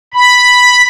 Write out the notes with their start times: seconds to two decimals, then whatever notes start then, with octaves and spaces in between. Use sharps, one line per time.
0.14 B5